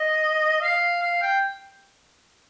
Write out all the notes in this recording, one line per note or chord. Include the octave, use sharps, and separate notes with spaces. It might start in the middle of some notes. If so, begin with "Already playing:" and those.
Already playing: D#5
F5
F5
G5